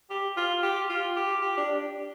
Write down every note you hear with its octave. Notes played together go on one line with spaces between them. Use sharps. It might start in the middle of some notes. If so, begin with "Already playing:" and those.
G4
F4
G4
F4
G4
G4
D4